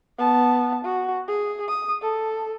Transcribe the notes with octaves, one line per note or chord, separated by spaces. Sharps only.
B3 A5
F#4
G#4
D#6
A4